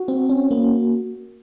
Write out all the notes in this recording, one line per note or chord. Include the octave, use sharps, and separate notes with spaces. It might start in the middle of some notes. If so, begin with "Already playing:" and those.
Already playing: F#4
C4
C#4
A#3